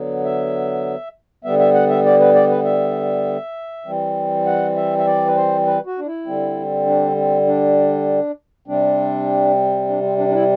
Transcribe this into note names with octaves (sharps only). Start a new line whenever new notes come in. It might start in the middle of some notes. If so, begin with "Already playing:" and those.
Already playing: D3 F#3 B3
E5
D3 G3 B3 E5
E5
F#5
E5
D5
B4
D5
B4
E5
E3 G3 C4
F#5
E5
E5
D5
B4
C5
B4
F#4
D4
E4
D3 G3 C4
D4
C4
D4
C3 G3 C4 D4
D4
C4
D4
D4
E4